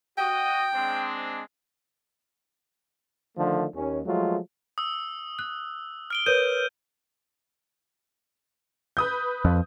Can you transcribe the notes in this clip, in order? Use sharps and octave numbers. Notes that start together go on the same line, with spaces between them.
F#4 D#5 G5
G#3 C4 D4
D3 D#3 F3 A3
D#2 C#4
F3 F#3 G#3 A3 F4
D#6 E6
F#6
F6 D7 G7
A#4 B4 C#5 G6 D#7
B4 D#6 G6
F2